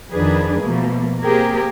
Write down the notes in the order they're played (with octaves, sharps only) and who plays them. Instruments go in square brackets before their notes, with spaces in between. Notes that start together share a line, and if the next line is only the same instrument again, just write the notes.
[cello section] F2 D#3 F3 D4 G#4 B4
B2 F3 A3 A#3
A#3 C4 G4 G#4 A#4